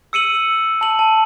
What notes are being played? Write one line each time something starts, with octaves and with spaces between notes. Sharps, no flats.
E6 C#7 D#7 F#7
A5 F#7
A5